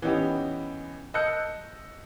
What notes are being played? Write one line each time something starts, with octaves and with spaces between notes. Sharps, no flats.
E3 B3 C#4 D#4 G4
D#5 A5 E6 F#6 G6 C#7